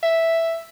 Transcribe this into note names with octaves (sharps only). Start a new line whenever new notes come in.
E5